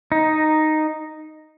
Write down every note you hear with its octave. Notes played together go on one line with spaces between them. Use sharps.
D#4